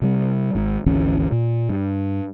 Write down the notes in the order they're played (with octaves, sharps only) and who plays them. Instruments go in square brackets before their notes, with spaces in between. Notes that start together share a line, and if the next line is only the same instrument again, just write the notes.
[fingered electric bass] C3 G3
G#1 G#2
G#1 D2 E3 C#4
A#2
G2